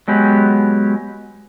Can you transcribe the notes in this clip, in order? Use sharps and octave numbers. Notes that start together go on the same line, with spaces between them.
F#3 G#3 B3 G4